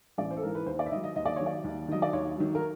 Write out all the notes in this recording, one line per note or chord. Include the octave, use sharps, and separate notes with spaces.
A1 D5
C5
A4
G#2 E3 A#4
B4
D#2 C5
D5
E5
D#3 F#3 D#5
D#5
D#2 D#5
D5
D#3 F#3 C#5
D5
D#2
D#3 F#3 D#5
D5
D#2 C#5
D#3 F#3
A#4